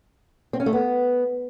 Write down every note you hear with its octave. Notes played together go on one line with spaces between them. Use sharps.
C4
C#4
A3
B3